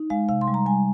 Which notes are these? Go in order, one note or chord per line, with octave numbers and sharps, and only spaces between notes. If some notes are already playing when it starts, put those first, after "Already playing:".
Already playing: D#4
G#3 F5
C3 F5
C6
G3
A#5
G3 G#5